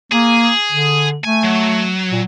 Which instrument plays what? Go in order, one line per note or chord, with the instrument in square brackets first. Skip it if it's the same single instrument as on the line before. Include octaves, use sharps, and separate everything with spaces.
[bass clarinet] A#3 [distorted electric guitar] G#4
[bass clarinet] D3
[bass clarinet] A3 [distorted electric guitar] G#5
[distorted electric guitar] F#3
[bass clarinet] A#2